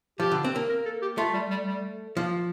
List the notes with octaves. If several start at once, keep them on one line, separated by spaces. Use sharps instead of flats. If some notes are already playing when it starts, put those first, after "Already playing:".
F3 G4
D3
C4
A#3
A#4
A4
G4
A3 F4
G3
G3
G3
F3 A#3